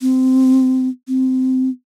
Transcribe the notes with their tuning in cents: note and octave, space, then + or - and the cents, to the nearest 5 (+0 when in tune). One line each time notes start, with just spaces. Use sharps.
C4 -15
C4 -15